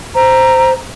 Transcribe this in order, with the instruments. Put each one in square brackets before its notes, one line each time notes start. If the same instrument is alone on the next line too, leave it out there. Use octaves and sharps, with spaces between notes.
[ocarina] C5 [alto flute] A#5